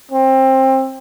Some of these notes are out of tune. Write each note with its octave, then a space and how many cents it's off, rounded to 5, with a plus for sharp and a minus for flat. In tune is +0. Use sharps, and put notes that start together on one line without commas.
C4 +20